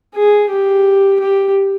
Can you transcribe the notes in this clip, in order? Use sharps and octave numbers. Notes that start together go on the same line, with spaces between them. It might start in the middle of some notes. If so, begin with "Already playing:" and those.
G#4
G4
G4